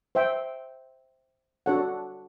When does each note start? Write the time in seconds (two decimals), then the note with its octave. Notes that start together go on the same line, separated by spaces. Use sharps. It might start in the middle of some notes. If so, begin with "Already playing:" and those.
0.15 C5 E5 G5
1.66 D4 F#4 A4 C#5 F#5